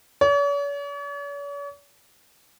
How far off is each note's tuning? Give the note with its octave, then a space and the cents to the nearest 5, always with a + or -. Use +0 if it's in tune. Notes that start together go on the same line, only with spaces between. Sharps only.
C#5 +45